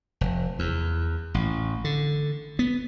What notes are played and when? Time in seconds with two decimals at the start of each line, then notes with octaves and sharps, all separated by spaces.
0.21 F1
0.59 E2
1.34 A1
1.84 D3
2.59 B3